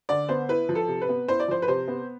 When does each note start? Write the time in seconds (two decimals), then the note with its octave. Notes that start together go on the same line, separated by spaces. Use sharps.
0.09 D3 D5
0.29 B3 C5
0.49 E4 B4
0.69 F3
0.75 A4
0.88 C3
1.02 B4
1.09 B3
1.28 E4 C5
1.40 D5
1.48 F3 C5
1.62 B4
1.68 C3 C5
1.88 B3